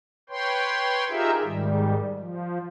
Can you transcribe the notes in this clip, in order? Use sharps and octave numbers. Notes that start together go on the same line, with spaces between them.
B4 C#5 G5 C6
D#4 F4 G4 G#4 A#4 E5
G#2 D#3 G3
F3